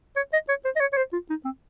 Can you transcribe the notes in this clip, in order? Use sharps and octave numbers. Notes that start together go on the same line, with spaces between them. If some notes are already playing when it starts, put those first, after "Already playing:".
C#5
D#5
C#5
C5
D#5
C#5
C#5
C5
F4
D#4
C4